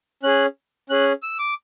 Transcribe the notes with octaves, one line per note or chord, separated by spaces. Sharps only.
C#4 G#4 F#6
C#4 G#4 F#6
E6
D6